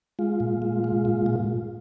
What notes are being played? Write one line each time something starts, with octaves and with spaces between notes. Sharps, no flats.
G#3 F4
A#2
G#3
G#3
A#2
A#2